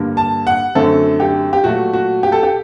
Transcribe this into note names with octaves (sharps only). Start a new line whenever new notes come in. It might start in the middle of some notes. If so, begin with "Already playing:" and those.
Already playing: G2 D3 G3 A#3
A5
F#5
F#2 D3 A3 C4 A4
G4
G4
A#2 F#3 A3 F#4
F#4
G4
A4
G4